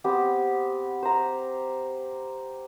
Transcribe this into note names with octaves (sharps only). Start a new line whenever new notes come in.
B3 C4 G4
C5 A#5